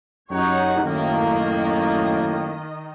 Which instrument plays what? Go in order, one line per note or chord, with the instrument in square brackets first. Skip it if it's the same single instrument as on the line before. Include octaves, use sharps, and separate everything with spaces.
[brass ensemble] F#2 G4 F#5 [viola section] D#4 C#5
[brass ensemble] F#2 A2 A#3 [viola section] D#3 D#5